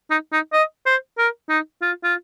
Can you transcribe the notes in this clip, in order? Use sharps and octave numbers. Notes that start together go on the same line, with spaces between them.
D#4
D#4
D#5
C5
A#4
D#4
F4
F4